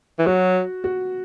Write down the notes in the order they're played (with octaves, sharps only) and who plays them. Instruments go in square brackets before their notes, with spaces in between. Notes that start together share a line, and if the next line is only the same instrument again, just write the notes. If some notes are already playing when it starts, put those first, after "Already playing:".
[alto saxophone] E3
[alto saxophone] F#3 [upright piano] F#4
[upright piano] F#4